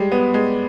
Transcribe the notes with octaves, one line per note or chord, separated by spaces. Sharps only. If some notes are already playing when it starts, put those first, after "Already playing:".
Already playing: G3 G#3
B3
G#3